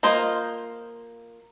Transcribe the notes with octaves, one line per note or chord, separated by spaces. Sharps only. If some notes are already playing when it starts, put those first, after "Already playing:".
A#3 F4 C5 D#5